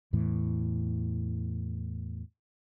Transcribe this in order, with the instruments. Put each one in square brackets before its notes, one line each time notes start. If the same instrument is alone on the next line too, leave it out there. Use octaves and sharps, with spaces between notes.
[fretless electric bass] E2 A2 E3